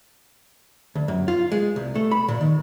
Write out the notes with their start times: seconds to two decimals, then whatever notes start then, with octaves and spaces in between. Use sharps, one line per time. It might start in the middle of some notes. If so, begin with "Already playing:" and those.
0.95 D2
1.08 F#2
1.28 F4
1.52 G#3
1.76 C2
1.95 A3
2.11 B5
2.28 A#2
2.41 D#3